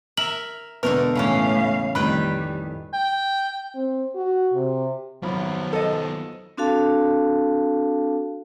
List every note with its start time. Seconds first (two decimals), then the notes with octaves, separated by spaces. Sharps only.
0.17 A#4 E5 F#7
0.83 E1 B2 D3 A3 B3 A#4 B4
1.15 A2 C#3 E3 C#4 F5
1.95 A1 F2 A2 D#3 G3 B4 G5 B5
2.93 G5
3.75 C4
4.15 F#4
4.54 C3
5.23 G#1 D#3 F3 F#3 B3 B5
5.73 A4 D#5
6.57 C4 D4 F#4 A4 F5 A5